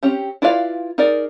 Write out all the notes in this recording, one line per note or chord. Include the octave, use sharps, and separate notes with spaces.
C4 C#4 G4
E4 F4 B4 D5 F5
D#4 G#4 A#4 D5